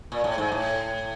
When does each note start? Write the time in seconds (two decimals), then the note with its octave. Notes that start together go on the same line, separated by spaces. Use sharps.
0.12 A#2
0.24 A2
0.38 G#2
0.52 A2